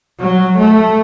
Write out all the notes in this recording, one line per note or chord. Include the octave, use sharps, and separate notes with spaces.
F#3
A3